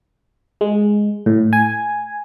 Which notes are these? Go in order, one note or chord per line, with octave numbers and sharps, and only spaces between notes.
G#3
A2
G#5